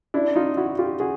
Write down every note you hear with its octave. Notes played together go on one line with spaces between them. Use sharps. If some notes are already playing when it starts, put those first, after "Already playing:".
D4 E4
D#4 F4
E4 F#4
F4 G4
F#4 G#4